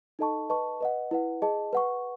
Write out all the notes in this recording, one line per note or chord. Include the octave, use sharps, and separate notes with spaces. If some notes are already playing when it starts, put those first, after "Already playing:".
D#4 A4 D#5 A5 C#6
B4 D#5 A5 C#6
B4 D#5 F#5
E4 B4 F#5
G#4 D#5 A5
B4 F#5 C#6